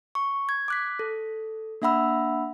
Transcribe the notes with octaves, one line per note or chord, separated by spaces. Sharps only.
C#6
G#6
D6 F#6 B6
A4
A#3 D4 E5 F#5 B5 E6